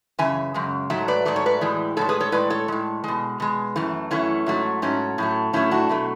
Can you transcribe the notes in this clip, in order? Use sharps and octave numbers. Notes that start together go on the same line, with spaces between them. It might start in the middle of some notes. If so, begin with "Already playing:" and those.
F#2 C#3 E3 E5 G#5
F#2 C#3 G#3
G#2 F#3 A3 E5
B4 D5
G#2 F#3 A3 D5
C#5
B4 D5
A2 E3 G#3
A2 E3 G#3 A4 C#5
G#4 B4
A4 C#5
A2 G#3 B4 D5
A4 C#5
A2 G#3
B2 G#3
B2 G#3
F#2 E3 A3
F#2 E3 A3 C#4 E4
G#2 F#3 A3
G#2 F#3 A3 C#4
A2 F#3 A3
A2 F#3 A3 C#4 E4
D4 F#4
B2 F#3 A3